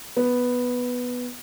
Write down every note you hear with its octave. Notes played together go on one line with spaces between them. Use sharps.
B3